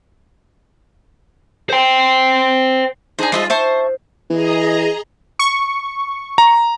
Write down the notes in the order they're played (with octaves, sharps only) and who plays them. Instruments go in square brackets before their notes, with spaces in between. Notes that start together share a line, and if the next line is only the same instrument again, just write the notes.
[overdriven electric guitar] C5 G5
[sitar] D4 D#4 G#4 [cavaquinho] C5 G#5
[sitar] G3 G#3 F4 [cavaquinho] C5 D#5 E5
[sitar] C5 [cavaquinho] E5 A5 C#6
[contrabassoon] E3 [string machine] G#4 D#5 A#5
[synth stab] C#6
[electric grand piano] A#5